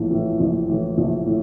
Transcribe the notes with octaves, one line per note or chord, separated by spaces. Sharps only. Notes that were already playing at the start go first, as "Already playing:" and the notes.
Already playing: A#1 A2 E3
A2 E3
A#1
A2 E3
A#1
A2